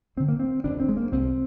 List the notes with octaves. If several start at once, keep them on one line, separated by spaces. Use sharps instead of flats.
D2 D3 C4
A#3
C4
F1 D#2 D3 D4
C4
G#3
A#3
C2 C3 C4